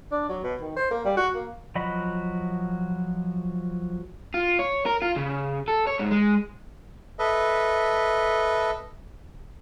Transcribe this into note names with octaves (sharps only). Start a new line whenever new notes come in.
D4
F#3
B2
D#3
C5
A#3
G3
F#4
A#3
F3 F#3 F#4 D#5 B5
F4
C#5
A#4
F4
C#3
A4
C#5
G#2
G#3
A4 B4 D#5 E5